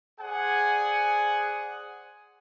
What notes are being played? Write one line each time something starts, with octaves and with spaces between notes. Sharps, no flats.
G#4 C5 D5 F#5 G#5